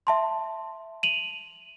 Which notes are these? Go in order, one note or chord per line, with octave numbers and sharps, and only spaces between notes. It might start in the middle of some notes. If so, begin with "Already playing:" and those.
E5 A5 C6
D#7 F7 F#7